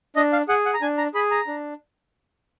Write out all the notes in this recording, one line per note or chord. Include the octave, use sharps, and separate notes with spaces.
D4 D#5
F5
G#4 F#5
F#5
A#5
D4 G#5
A#5
G#4 B5
A#5
D4